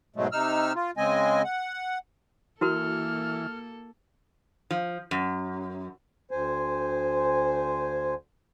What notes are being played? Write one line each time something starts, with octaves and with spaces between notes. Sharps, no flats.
G#2 B2 F#3 G#3 A3
C3 D#4 E6 F6
F4
C#3 G#3 C4 D#5 G#5
F#5
E3 A#3 E4 F#4 A4 A#4 F6
F3
F#2
D2 C5 G#5